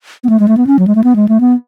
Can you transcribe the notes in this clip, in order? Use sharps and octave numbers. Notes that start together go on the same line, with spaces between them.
B3
A3
G#3
A3
B3
C#4
F#3
G#3
A3
B3
G#3
A3
B3